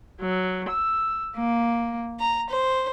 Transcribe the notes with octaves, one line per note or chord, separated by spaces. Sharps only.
F#3
E6
A#3
A#5
C5